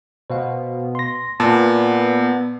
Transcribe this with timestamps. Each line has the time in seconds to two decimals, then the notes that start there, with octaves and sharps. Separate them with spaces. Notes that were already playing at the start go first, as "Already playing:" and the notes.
0.30 B2 C5 F5
0.95 C6 A#6
1.40 A#2 B3 D5 A5